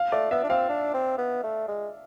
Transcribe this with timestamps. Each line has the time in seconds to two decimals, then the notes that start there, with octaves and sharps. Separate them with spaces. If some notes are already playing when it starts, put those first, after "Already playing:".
Already playing: F5
0.12 A3 D5
0.31 B3 E5
0.43 D4
0.49 C4 F5
0.69 D4
0.94 C4
1.18 B3
1.43 A3
1.68 G#3